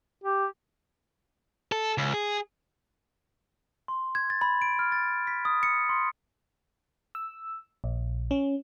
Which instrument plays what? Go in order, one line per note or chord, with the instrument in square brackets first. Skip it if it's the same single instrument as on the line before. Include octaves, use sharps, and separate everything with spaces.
[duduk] G4
[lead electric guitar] A4
C#2
G#4
[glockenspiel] C6
G#6
A6
B5
D7
F6
A6
B6
D#6
C#7
C6
[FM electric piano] E6
A#1
C#4